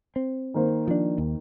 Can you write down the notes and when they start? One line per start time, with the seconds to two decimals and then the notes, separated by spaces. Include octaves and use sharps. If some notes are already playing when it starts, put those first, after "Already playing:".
0.16 C4
0.54 D#3 A#3 C5
0.88 F3 D4
1.18 D#2